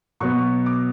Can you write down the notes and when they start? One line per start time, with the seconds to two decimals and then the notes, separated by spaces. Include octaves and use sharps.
0.20 B2 F#3 B3 C#6
0.66 D6